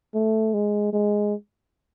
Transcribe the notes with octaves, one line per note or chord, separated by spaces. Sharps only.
A3
G#3
G#3